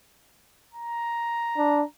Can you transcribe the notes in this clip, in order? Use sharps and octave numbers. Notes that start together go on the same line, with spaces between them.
A#5
D4